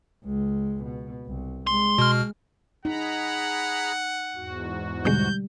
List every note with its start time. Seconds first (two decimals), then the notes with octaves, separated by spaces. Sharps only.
0.24 C#2 G#3
0.84 B2
1.26 C2
1.67 G#3 C6
1.98 B2 F6
2.85 D#4 G#4 F#5 A#5 B5
4.35 E2 G#2 F#4
5.05 B2 D3 G3 G#3 G6